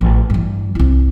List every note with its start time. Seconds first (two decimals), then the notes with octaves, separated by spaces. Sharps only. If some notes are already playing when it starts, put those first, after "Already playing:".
0.01 A1
0.30 G2 E3
0.75 C2 E4